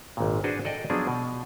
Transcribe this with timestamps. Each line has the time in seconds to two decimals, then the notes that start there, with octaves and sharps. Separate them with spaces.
0.17 G#1 A#2
0.44 D4 F#4 G#4 B4 C5
0.65 A4 D5 D#5 G5
0.90 F3 F#3 B3 D4 G#4
1.07 B2